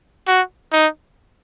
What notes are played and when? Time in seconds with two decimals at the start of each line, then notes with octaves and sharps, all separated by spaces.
0.28 F#4
0.73 D#4